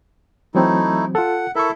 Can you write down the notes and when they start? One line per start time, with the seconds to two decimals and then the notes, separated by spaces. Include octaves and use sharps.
0.55 E3 F#3 A3 C4 D#4 E4
1.15 F4 A4 F#5
1.56 E4 A4 A#4 E5 C#6